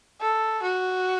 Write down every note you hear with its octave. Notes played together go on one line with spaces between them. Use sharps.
A4
F#4